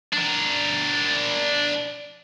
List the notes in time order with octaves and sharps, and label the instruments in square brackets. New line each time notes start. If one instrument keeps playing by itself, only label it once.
[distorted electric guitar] D4 A#4